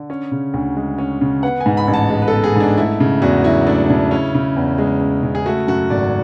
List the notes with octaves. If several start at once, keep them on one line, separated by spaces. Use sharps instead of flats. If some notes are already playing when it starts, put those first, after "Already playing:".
Already playing: D3
C#4
C#3
D2
G#3
C#4
C#3
B3 F#5
G#5
G#2
B5
A1
A5
G#3
B4
B3 A4
G#4
G#2 D4
A3 E4
C#3
E2 F#4
F#3 E4
A3 D4
C#3
C#4 E4
C#3
E2
G#3
C#4
C#3
G#4
A3 F#4
F#2 F#4
G#1 D5